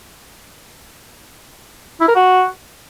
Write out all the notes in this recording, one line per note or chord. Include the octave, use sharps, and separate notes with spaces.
E4
A#4
F#4